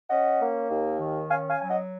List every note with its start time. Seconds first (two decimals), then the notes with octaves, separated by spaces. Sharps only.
0.10 C#4 D#5 F#5
0.41 A#3
0.70 D#2
1.00 D#3
1.30 C#4 F5 G#5
1.50 F5 G#5
1.60 F#3 G#5
1.70 D#5 F#5